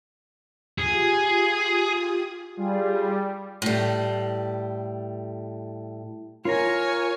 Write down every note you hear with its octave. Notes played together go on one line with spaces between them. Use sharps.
F4 G4 G#4 D#6
G3 F4 G#4
A2 G3
F4 A#4 C#5 G#5 A#5